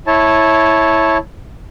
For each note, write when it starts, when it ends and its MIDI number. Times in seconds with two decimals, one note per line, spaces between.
0.07 1.18 64
0.07 1.18 73
0.07 1.18 81